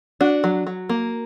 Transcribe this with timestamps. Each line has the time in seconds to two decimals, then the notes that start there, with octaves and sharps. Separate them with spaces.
0.21 D4 F#4
0.44 F#3
0.67 F#3
0.89 A#3